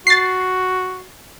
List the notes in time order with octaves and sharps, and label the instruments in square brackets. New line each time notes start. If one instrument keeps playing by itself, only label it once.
[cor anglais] F#4 [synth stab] A6 C7